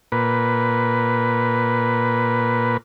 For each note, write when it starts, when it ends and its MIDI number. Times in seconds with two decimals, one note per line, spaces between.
0.12 2.77 46
0.12 2.77 71